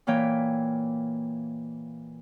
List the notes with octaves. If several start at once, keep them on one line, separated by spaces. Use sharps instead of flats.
A#2 E3 A#3 C#5 G5